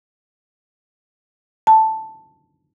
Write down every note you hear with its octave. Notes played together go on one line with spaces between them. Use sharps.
A5